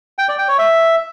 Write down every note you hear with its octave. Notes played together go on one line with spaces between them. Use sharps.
G5
D5
G5
C#5
E5